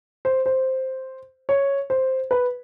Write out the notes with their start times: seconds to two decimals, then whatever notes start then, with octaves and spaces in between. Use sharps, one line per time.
0.25 C5
0.46 C5
1.49 C#5
1.90 C5
2.31 B4